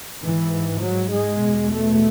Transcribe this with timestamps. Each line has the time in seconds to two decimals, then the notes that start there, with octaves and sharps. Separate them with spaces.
0.22 G#2 E3
0.81 F#3
1.11 G#3
1.41 E2 B2
1.71 A3